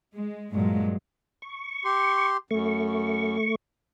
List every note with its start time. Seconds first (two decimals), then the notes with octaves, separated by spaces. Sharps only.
0.14 G#3
0.53 G2 A#2 F#3 G#3
1.42 C#6
1.85 G4 C6
2.51 F#2 A3 C#6